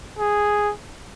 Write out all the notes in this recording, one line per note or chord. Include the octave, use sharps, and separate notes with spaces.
G#4